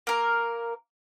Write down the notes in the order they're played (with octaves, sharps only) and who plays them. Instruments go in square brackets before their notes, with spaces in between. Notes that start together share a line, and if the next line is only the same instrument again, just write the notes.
[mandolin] A#3 A#4